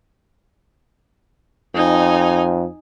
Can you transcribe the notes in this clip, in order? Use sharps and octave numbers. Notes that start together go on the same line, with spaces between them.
F2 D#4 G#5